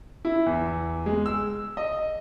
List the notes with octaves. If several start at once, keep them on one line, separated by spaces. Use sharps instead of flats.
E4
E2
G#3
E6
D#5